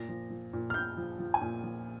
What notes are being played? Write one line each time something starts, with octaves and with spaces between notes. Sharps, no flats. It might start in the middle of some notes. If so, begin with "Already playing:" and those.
Already playing: A#2 A#6
F3
F3
A#2
F6
A#2 G6
F3
F3
G#5
A#2
F3